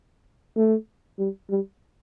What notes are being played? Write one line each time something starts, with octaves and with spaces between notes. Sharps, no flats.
A3
G3
G3